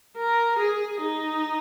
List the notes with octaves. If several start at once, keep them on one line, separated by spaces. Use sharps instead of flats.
A#4
G#4
D#4